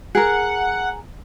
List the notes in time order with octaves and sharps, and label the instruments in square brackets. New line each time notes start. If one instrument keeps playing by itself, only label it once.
[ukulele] G#4 A#4 [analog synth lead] F#5